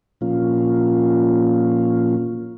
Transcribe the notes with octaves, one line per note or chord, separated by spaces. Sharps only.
A#2 F3 A#3 C#4 F4